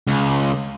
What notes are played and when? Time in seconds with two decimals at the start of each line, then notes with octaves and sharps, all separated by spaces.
0.07 C#2